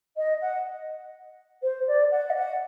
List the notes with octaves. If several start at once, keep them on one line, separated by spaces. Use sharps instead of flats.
D#5
F#5
C5
D5
F#5
D#5
F#5